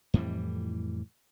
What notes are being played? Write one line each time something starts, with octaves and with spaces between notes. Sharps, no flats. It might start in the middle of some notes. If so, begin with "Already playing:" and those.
F2 A2 E3 G3